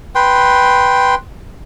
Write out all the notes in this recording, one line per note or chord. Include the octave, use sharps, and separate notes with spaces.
B4 G5 C6